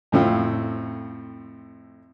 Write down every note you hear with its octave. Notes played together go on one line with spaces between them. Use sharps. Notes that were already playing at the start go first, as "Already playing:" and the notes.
F2 A2 C4 F4